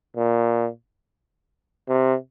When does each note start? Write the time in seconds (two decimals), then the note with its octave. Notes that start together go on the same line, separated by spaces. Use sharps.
0.17 A#2
1.89 C3